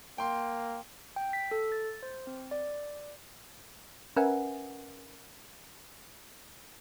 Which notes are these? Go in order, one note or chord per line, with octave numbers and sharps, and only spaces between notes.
A#3 G5 C6
G5
B6
A4
A6
C5
C4
D5
C#4 A#4 B4 E5 F#5 G#5